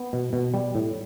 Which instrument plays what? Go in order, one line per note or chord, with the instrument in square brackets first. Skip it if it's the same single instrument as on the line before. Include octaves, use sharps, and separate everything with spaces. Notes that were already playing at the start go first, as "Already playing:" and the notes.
Already playing: [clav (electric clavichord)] B3
B2
B2
G3
A2